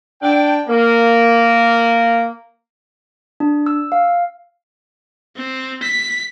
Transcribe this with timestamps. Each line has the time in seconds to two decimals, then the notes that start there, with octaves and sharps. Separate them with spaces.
0.21 D4 G5
0.68 A#3
3.40 D4
3.66 E6
3.92 F5
5.37 C4
5.83 B6